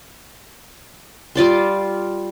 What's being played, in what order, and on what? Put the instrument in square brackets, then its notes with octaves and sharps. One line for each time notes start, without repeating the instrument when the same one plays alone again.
[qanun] G3 F4 D5 C6